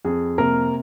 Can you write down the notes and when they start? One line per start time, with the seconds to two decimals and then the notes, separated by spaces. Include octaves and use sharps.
0.05 F2 G#4
0.38 C3 A#3 A#4